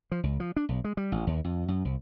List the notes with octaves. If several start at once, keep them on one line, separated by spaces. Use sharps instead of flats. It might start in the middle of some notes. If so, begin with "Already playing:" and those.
F3
C#2
F3
D4
B1
G#3
G3
A1
D#2
F2
F#2
C2